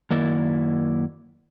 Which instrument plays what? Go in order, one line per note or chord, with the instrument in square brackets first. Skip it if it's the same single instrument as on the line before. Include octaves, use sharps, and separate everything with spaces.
[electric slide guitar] F#2 D#3 A#3 E4 D5